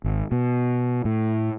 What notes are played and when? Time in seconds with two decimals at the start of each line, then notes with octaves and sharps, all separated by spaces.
0.04 G#1
0.32 B2
1.05 A2